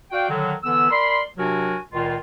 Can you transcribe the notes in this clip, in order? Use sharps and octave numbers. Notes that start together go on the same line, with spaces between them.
F#4 D5 F5 G5
D3 D#3 F#3
D3 E3 B3 E6
A#4 D5 B5 C6
C3 F#3 D4 F#4 A#4 G#5
C#2 A#2 D#3 F4